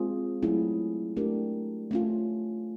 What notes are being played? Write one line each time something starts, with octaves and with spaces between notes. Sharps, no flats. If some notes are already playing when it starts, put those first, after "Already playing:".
Already playing: G#3 C4 F4 G#4
F#3 A3 C#4 E4 G#4
A3 D4 G4 A#4
A3 C#4 F4